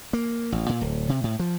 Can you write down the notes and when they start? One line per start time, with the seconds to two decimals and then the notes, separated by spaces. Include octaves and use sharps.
0.13 A#3
0.52 A1
0.69 A#2
0.81 D1
1.09 C3
1.24 A2
1.40 F3